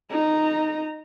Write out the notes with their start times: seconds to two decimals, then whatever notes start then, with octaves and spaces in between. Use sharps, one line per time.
0.10 D#4 A#5